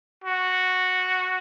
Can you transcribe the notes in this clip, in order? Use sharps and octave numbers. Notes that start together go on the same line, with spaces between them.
F#4